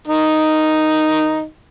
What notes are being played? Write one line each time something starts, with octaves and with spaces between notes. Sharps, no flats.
D#3 D#4